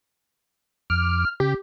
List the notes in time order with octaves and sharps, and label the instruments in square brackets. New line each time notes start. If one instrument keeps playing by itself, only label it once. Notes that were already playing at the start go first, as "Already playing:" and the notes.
[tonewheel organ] F2 D6 [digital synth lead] F6
[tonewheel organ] C#3 [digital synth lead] G4